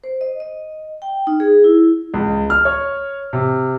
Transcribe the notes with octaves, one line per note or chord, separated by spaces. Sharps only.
C5
D#5
D#5
G5
D#4
G#4
E4
C#2
F6
C#5
C3